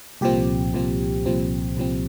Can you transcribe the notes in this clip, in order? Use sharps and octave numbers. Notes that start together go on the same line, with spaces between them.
C2 A#2 F3 C4 G4
C2 A#2 F3 C4
C2 A#2 F3 C4
C2 A#2 F3 C4